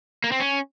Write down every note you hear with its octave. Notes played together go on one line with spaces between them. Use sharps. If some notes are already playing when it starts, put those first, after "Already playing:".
A#3
C4
C#4